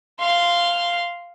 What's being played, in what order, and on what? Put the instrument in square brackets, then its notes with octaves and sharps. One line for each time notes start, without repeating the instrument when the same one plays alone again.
[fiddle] F5 C6